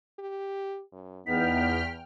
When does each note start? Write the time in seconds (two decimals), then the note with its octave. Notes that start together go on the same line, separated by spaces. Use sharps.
0.19 G4
0.92 F#2
1.27 E2 B3 D#4 G5 F6 B6